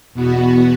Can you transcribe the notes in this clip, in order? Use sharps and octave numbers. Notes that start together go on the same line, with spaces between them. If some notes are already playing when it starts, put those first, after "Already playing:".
E2 B2 B3 F#4